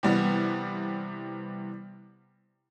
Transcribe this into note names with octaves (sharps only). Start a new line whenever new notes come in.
C3 E3 G3 B3